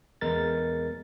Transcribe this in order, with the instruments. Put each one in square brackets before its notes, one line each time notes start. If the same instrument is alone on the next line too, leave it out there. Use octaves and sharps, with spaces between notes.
[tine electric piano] E2 G#3 A#4 A6